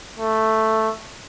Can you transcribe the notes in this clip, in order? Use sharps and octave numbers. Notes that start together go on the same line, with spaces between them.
A3